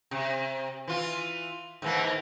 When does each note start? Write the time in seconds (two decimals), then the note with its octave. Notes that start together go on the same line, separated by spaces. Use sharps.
0.11 C3
0.87 E3 F4
1.82 G#2 E3 A#3